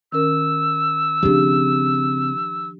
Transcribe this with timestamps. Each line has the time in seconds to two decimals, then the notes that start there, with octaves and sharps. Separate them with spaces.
0.12 D#3 C#4 A#4 E6
1.23 C#3 F3 C4 D4 G4